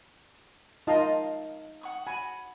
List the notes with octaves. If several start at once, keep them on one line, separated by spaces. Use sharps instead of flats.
D#4 F4 A#4 D#5 F5 A5
F#5 C#6 D#6
F#4 G#5 B5